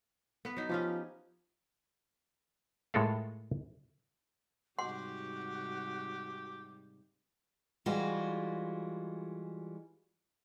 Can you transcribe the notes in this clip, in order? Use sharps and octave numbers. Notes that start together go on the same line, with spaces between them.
B3 B4
F#3 D#4
F3 C#4 F4 G4
A2 G#3 F4 A4 A#4 F5
G#2 C3 G3 F#4 G4 F#5 C6
E3 G3 G#3 F4 F#4